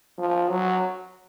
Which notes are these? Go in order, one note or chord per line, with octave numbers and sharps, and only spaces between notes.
F3
F#3